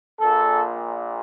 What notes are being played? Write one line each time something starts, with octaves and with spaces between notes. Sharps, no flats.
A#1 A#2 A4